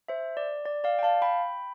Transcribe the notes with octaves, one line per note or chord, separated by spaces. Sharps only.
C5 E5
D5
D5
D5 F5
G5
F5 A5
G5 B5